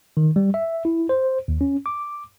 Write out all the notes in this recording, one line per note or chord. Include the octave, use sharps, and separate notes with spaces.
D#3
G3
E5
E4
C5
D#2
C#4
D6